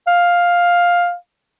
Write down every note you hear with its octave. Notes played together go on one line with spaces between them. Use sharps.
F5